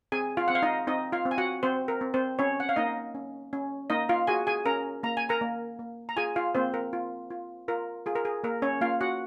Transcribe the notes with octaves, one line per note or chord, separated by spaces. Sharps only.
C4 G#4 G#5
F4 F5
C4 F#5
F5
D#4 D#5
C4 D#4 D#5
F4 F5
C4
G#5
F#4 F#5
C4 C5
A#4
C4
C4 C5
C#4 C#5
F#5
F5
A#3 D#4 D#5
C#4
C#4
A#3 D#4 D#5
F4 F5
F#4 G#4 G#5
G#4 G#5
C#4 A#4 A#5
A#3 A#5
G#5
A#4 A#5
A#3
A#3
A#5
F4 G#4 G#5
F4 F5
A#3 C4 C5
A#4
F4
F4
F4 A#4
F4 G#4
A#4
G#4
A#3 A#4
C#4 C#5
A#3 F4 F5
F#4 F#5